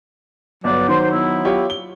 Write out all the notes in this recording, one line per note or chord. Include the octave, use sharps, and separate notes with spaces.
G1 F#3 B4 D5
D#3 C5
B3 E4
F4 G4 C#5
G7